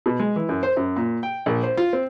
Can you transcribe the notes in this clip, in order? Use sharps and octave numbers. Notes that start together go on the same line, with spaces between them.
B2
G#3
E3
F#2
C5
F#2
A#2
G5
A#1
C5
F4
C4